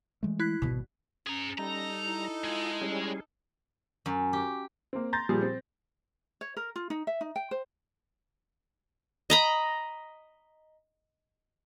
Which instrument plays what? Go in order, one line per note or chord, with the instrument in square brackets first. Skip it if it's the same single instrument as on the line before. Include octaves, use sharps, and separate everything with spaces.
[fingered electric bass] E3 G#3 A3
[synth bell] E4 F#6 B6
[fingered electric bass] G#1 [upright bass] B2 G3
[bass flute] C#4 [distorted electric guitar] G#4 A#5
[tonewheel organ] G3 [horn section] D#4 A4 [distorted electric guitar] A#5
[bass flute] E4
[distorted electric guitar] G#3 [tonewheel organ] F4
[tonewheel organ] G3 C#4 G#4
[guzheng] F#2
G4
[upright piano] A#3 C4
A#5 C6 G6 A6 A#6
A#2 F3 G3 G#4
C4
[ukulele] C#5
A#4
F4
D#4
E5
D#4
G5
C5
[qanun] D#5 A#5 B5